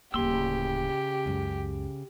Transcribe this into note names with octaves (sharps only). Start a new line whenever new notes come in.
D1 C#3 A#3 G4 C6 E6
C#2 F#2